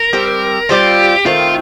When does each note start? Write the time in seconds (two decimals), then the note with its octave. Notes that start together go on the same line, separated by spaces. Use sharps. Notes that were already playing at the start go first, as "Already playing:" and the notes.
Already playing: A#4
0.13 G3 C4 G4
0.69 G3 C4 F4 G4
1.25 D#3 A3 C4 F4